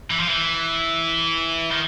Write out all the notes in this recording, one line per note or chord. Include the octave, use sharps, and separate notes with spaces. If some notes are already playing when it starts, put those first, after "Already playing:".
E3
F3
E3
D#3